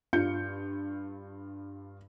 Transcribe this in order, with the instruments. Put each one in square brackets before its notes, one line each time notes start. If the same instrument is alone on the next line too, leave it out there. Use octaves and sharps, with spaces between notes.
[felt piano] G2 F4 G6 C#7